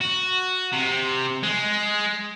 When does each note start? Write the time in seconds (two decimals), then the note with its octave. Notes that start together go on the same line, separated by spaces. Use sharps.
0.01 F#4
0.72 C3
1.43 G#3